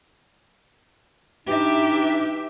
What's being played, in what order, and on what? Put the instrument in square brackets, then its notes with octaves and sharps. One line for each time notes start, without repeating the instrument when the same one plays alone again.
[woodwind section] E3 D4 D#4 [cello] G4 E5